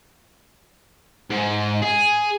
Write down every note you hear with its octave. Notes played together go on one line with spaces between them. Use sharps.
G#2
G#4